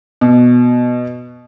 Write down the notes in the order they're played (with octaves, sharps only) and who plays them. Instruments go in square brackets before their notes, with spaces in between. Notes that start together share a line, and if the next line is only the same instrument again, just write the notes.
[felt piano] B2